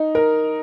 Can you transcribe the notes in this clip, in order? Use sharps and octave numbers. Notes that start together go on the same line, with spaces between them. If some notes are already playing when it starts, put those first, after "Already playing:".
Already playing: D#4
A#4